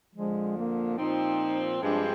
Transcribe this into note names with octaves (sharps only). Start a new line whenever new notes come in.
F2 D3 F3 G#3
A#3
A#2 F3 C4 D#4
G2 F3 G#3 C4 D4 G4